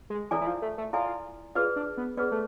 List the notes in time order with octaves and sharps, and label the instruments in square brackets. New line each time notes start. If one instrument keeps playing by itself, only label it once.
[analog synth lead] G#3
[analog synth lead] E3 [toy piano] E4 A4 D5 G#5
[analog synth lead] E3
F3
A3
A3
[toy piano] E4 A4 D5 G#5 [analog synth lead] F4
[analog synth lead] F4 [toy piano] G#4 B4 D5
[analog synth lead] D4
B3
[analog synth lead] B3 [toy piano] G#4 B4 D5
[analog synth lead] A3